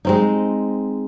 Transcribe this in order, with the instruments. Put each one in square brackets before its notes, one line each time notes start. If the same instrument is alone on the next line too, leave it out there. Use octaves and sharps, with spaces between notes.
[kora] G#3 C4 D#4